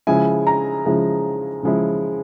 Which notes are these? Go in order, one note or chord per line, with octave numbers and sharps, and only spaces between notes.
C#3 F3 G#3 E4 G#5
A#5
C#3 F3 G#3 E4
C#3 F3 G#3 E4